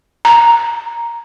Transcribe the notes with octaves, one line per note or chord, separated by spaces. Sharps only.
A#5